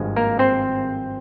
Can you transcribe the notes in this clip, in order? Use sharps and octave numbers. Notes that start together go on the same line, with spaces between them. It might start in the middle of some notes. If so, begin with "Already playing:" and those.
Already playing: G#1 G2 F3 G#3
A#3 A#4
C4 C5